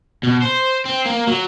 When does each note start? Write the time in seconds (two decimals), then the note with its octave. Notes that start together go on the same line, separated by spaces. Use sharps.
0.23 B2
0.42 C5
0.86 C4
1.06 A#3
1.28 F#3